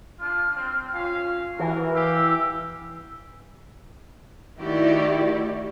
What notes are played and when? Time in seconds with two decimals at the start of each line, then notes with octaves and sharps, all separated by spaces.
0.20 D4 F4 F6
0.55 C4 G5
0.92 C#4 F4 F5
1.59 E3 F#4 A#4
1.93 G4 F5 E6
4.60 D#3 A3 E4 F#4 G4 D5